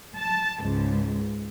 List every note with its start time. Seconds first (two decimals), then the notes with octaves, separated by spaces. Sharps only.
0.18 A5
0.60 C#2 G#2